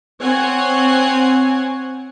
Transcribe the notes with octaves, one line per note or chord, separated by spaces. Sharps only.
C4 C5 C#5 F#5 G#5